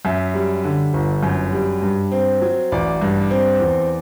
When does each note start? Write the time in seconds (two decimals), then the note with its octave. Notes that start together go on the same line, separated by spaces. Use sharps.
0.05 F#2 E5
0.34 G3
0.64 D3
0.94 G1
1.23 F#2
1.53 G3
1.82 G2
2.12 C4
2.42 F#3
2.72 A1 D5
3.01 G2
3.31 C4
3.60 E2